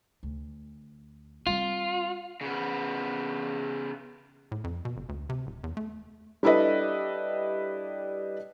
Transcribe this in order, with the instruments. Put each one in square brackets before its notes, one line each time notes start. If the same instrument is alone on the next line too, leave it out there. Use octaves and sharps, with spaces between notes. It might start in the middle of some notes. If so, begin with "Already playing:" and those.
[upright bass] D2
[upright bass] G3 C4 [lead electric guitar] F4
[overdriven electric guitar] C#3 B3
[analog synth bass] A2
F2
B2
G1
D2
C3
D#1
E2
A3
[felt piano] G3 D4 E4 A4 B4 D#5